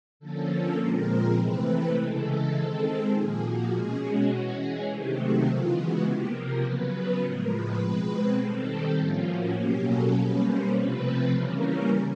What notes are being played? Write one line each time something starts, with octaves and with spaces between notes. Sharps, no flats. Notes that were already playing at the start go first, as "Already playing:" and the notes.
D3 F3 A#3 C#4 A4
A#2 F3 G#3 C4 A#4
C3 E3 A3 C4 B4
C#3 E3 G#3 A4
D#3 G#3 C4
A#2 F3 A#3 G#4
F#4
B2 G#3 C#4 G#4
F#4
E3 G#3 C#4 F#4
G#4
C3 D#3 F#3 A3 C4 G4
F#4
C#3 E3 G#3 B3 F4
F#4
C3 F3 A#3 G4
A#4
C#3 F#3 B3 B4
A2 F3 G#3 A#4
B4
B2 G#3 C4
D#3 G3 C4 A4
A2 F3 A#3 C#4 F4
F#4
B2 F#3 A#3 C#4 G4
A4
B2 G3 A#3 C#4 B4
C5
C3 F3 A3 C4 B4
C#3 E3 G3 A#3 C#4 A#4